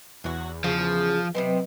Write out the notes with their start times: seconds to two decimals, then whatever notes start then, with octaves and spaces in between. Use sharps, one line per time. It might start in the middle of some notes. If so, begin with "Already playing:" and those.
0.24 E2 F#3 F#4
0.64 C#3 F3
1.35 C3 F#3 B3 C4 B4 D#5